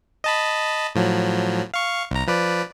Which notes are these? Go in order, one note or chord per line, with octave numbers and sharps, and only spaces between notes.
D#5 A5 B5
A2 F3 F#3
F5 C#6
C2 A#5
F3 B4 D5